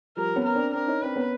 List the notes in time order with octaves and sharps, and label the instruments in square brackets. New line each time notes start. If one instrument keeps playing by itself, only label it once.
[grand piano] F3 G3 [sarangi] A#4
[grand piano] B3 C#4
[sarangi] A#4
[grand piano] C4 D4
[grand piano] C4 D4 [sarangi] A#4
[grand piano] C#4 D#4
[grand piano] C4 D4 [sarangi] B4
[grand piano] B3 C#4